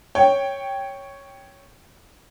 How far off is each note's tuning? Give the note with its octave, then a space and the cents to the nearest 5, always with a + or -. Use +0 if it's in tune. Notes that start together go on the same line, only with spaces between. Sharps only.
C#5 +0 G5 +0